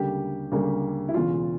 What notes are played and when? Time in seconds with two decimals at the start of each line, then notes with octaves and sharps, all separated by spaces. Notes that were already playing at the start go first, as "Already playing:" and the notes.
Already playing: D2 C#3 G3 A#3 G4
0.52 D2 C#3 G3 A#3
1.08 E4
1.14 E1 E2 C#3 F4